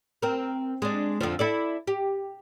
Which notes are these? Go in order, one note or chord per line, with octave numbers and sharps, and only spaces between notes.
C4 A#4
G#3 D4
F2 D3 F3
E4 A4 D5
G4